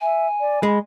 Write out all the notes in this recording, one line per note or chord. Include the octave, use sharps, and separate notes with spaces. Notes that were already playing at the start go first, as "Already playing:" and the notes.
E5 G#5
D5
G#3 B5